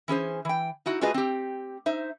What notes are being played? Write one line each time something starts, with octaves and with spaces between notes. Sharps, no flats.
E3 C#4 G#4 C5
E3 G5
D#4 E4 F#4
A3 F4 F#4 G#4 B4 D#5
C4 G4
D#4 C5 E5